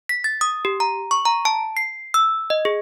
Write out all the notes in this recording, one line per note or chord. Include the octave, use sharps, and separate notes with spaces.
B6
A6
D#6
G4
A#5
C#6
A#5
A5
C7
E6
D#5
G#4